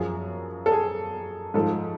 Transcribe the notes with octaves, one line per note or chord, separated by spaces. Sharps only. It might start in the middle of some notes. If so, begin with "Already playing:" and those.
Already playing: F#2 F3 G#4
A4
G#4
G#2 F3 A4